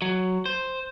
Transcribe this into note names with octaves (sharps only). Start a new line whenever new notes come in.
F#3
C5